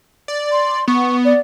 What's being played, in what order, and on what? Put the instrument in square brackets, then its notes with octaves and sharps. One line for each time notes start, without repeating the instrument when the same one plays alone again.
[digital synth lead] D5
[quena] C6
[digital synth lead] B3 [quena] C#6
[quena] D5